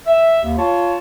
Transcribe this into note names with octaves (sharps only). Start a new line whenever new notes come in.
E5
D#2
F4 C#5 A5